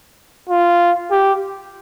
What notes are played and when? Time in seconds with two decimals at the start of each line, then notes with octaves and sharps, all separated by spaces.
0.49 F4
1.11 G4